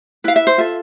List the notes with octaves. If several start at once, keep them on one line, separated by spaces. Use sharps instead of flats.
E4 B4 F5
E5
C5
F4 A4 E5